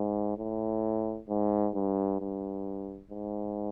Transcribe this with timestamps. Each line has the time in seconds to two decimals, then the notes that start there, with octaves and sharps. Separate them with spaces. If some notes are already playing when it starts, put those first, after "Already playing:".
Already playing: G#2
0.38 A2
1.29 G#2
1.75 G2
2.20 G2
3.11 G#2